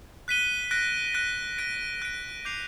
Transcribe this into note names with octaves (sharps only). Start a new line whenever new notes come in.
F#6 B6 D#7 G7
F#6 A#6 D7
F#6 A#6 D7
F#6 A#6 D7
F#6 A#6 D7
D6 G6 C7 F7